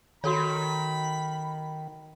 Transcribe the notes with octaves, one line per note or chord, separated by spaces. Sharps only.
D#3 F#4 A4 C#5 B5